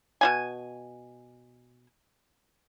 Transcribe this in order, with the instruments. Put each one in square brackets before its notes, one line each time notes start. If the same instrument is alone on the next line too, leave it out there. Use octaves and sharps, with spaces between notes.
[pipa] B2 D#4 G#5